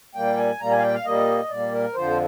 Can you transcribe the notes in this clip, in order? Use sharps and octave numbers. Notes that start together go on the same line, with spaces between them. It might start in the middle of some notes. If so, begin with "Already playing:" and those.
A#2 G3 A#3 G5
G#5
A#2 G3 A#3 A#5
G#5
F5
G5
F5
A#2 G3 A#3 D#5
A#2 G3 A#3 D5
A#4
F2 D3 F3 C5